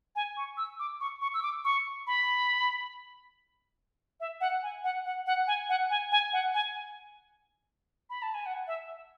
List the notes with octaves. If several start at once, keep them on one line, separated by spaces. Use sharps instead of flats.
G#5
C#6
E6
D6
C#6
C#6
E6
D6
C#6
B5
E5
F#5
G#5
F#5
F#5
F#5
G#5
F#5
G#5
G#5
F#5
G#5
B5
A5
G#5
F#5
E5